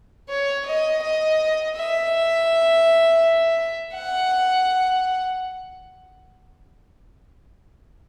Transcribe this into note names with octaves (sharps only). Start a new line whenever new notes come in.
C#5
D#5
D#5
E5
F#5